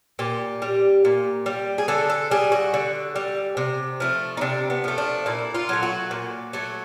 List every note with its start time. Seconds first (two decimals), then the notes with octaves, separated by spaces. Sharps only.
0.19 A#2 G4
0.62 G3
1.05 A#2
1.46 G3
1.78 G#4
1.88 D3 A4
2.10 A4
2.31 G3 G#4
2.52 F#4
2.74 D3
3.16 G3
3.57 C3
4.00 F3 A3
4.37 D#4
4.41 C3 D4
4.70 B3
4.84 F3 A3
4.98 D4
5.26 A#2 E4
5.55 F4
5.69 F#3 A3
5.83 F#4
6.11 A#2
6.53 F#3 A3